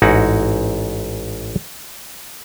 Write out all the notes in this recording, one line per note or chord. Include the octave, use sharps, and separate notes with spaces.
A1 G#2 D#4 E4 F#4 F#5